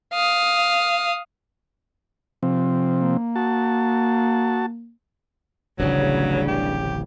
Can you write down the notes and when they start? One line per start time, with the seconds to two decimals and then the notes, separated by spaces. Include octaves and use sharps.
0.13 F5 D#6
2.43 C3 F3 C4
2.98 A#3
3.36 F#4 A5
5.79 D1 A1 G2 C#3 F#3
6.48 G4